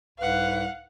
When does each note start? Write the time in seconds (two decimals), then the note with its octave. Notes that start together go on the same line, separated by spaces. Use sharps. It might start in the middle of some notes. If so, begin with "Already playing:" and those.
0.19 C2 G#2 B4 F5 F#5